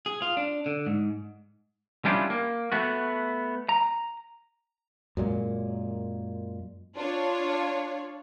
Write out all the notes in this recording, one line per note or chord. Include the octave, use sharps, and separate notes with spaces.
G#4
F4
D4
D3
G#2
G3 C#4 D4 E4 F4 G4
A#3
A3 B3 F#4
A#5
F#2 A#2 G#3
D4 F4 C#5